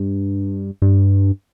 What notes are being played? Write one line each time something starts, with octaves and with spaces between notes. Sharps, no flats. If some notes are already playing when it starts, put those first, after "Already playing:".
Already playing: G2
G2